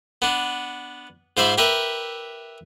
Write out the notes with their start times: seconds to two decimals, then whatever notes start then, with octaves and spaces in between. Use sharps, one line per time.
0.22 B3 D4
1.37 G#2 F4 C5 D5 E5 B5
1.58 G4 A#4 B4 E5